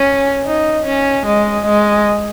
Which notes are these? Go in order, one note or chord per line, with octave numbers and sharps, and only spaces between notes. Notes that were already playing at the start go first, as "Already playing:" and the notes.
Already playing: C#4
D#4
C#4
G#3
G#3